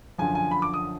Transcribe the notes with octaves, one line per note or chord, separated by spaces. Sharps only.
F#2 D3 F3 G#5
G#5
B5
D6
D#6